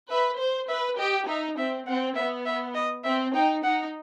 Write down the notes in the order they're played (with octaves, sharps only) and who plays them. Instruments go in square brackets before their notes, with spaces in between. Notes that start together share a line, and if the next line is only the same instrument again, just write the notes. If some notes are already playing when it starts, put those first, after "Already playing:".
[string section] B4 [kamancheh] E5
[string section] C5
[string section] B4 [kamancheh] E5
[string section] G4 [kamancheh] D#5
[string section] D#4 [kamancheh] E5
[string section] C4 [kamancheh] E5
[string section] C4 [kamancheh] F#5
[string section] B3 [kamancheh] E5
[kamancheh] E5
D#5
[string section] C4 [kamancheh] E5
[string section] D#4 [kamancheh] G5
[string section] D#4 [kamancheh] F#5